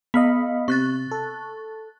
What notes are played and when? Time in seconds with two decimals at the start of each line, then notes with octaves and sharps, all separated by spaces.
0.14 B3 D#5 F5 B5
0.68 C3 C#6 F#6 A6
1.11 A4